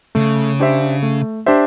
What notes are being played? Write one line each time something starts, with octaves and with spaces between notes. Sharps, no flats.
C#3 A3
D4 G4 C5 E5
A3
D4 G4 C5 E5